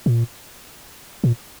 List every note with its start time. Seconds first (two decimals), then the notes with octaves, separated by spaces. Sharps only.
0.06 A#2
1.24 A#2